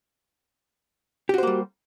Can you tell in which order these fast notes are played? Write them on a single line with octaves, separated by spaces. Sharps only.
G4 F#4 C5 A#3 G3